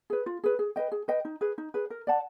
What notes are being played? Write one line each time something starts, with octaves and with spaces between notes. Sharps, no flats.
G#4 B4
F4
G#4 B4
G#4
B4 D#5 G5
G#4
B4 D#5 G5
D#4
G#4 B4
D#4
G#4 B4
A#4
D5 F#5 A5